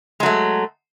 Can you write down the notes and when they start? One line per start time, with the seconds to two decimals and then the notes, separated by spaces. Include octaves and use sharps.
0.20 G#3
0.23 F#3
0.26 A3